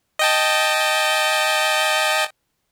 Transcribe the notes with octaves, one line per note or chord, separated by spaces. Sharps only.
D#5 G5 A5